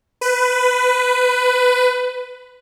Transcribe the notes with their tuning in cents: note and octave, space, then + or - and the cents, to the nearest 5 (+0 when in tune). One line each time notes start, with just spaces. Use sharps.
B4 +15